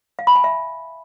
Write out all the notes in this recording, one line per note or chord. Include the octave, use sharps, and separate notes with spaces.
F5
B5
G#5
E5